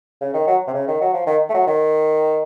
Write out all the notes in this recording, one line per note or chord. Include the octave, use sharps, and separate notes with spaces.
C#3
D#3
F#3
C3
C#3
D#3
F#3
F3
D#3
A3
F#3
D#3